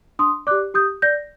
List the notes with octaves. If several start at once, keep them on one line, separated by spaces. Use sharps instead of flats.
D4 C6 D#6
G4 D5 D6 F#6
G4 D#6 G6
D5 G6 A#6